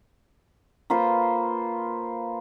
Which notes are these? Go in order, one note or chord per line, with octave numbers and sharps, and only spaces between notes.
A#3 F4 B4 C5